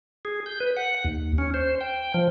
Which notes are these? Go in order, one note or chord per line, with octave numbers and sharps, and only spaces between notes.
G#4
G6
B4
F#5
D#2
C#4
C5
G5
F3